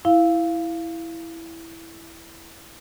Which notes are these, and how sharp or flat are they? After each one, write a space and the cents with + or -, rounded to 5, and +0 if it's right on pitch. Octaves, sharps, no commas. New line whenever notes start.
E4 +0 F5 -10